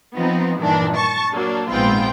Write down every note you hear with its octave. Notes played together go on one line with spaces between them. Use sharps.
F3 B3 C4 D#4
G2 A#2 D#3 E3 D4
A5 C#6
F#3 A#3 D4
A#1 G#2 B3 C4 F4 G5